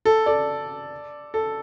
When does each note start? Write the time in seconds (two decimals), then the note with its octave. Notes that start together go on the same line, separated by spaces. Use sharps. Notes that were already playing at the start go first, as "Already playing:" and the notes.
0.05 A4
0.26 A4 D5
1.34 A4